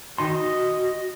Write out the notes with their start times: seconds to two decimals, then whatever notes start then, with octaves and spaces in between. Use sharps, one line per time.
0.18 D#3 D#4 F#4 C6
0.34 D#5